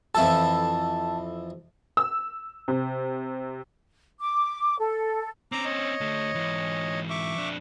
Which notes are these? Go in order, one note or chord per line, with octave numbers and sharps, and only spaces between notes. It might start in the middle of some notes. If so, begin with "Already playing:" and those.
F2 E3 A4 A5
E6
C3
D6
A4
C4 C#4 A#5 D6
C#5 D#5
D2 A3
G#2 E3
E5 C#6 D6
F2 D4